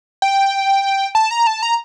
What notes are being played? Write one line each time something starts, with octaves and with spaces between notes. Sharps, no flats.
G5
A5
A#5
A5
A#5